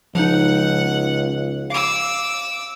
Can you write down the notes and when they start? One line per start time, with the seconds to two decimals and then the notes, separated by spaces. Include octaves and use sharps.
0.15 C#2 F3 D#4 F#5
1.70 F5 D6 E6